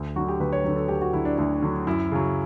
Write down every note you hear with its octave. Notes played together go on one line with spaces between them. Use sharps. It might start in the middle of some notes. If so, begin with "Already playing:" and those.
Already playing: D2
D3 F#3 F#4
G4
D2 B4
C#5
D3 F#3 B4
A4
D2 G4
F#4
D3 F#3 E4
D4
D2 D4
D3 F#3
F#2 E4
C#3 F#3